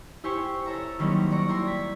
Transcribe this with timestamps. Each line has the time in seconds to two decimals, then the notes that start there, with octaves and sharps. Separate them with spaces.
0.24 E4 G4 C5 G#5 C#6
0.66 A4 C#5 E5 A#5
0.99 D#3 F#3 G3 A#3 C4 C#4
1.31 D5 A#5 C#6
1.48 E4 G5 A#5 C6
1.67 G#6 B6